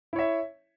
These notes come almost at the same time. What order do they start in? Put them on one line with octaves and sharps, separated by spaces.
E4 C#5 E5